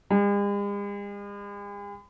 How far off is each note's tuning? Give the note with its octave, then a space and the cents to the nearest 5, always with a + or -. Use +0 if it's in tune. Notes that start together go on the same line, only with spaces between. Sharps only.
G#3 -45